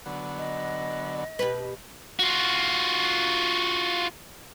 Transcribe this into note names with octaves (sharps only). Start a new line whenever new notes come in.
D3 F#3 B3
D#5
B2 G4 B4
F4 F#4